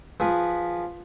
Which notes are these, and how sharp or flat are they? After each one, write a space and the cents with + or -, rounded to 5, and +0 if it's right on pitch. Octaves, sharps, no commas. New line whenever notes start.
F3 +0 G#4 -15 B4 +0